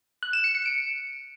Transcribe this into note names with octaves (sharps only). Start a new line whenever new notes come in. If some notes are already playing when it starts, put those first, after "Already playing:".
F#6
E7
C#7
C#7
D7